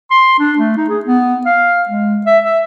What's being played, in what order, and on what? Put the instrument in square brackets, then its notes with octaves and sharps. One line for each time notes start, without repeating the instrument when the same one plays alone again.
[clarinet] C6
D4
A3
D#4
G#4
B3
F5
G#3
E5
E5